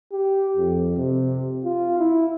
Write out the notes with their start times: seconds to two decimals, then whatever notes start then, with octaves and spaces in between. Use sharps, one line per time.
0.12 G4
0.57 F2
0.97 C3
1.64 F4
1.99 E4